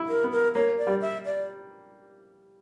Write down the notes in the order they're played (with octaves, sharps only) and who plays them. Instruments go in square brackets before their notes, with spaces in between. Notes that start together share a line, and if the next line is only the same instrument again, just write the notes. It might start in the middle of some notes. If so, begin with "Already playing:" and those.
Already playing: [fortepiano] E4
[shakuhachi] A#4
[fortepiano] B3
[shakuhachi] A#4
[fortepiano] A#3 [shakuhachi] C#5
[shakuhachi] D5
[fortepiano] G3
[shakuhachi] E5
D5